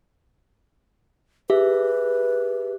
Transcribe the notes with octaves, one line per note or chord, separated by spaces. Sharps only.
G4 G#4 B4 E5